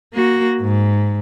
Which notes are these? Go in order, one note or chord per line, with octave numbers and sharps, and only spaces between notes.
A#3 F#4
G#2